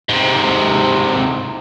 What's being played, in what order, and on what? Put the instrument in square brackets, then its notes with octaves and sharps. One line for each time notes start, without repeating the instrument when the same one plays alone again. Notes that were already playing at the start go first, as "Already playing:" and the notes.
[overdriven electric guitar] G#2 C3